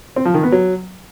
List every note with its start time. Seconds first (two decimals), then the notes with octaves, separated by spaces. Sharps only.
0.16 C4
0.25 F3
0.34 D#3
0.43 B3
0.52 F#3